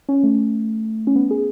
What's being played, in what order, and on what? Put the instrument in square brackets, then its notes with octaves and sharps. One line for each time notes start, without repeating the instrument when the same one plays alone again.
[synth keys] C#4
A3
C#4
B3
G#4